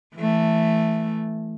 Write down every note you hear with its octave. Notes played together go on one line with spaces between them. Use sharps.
E3 A3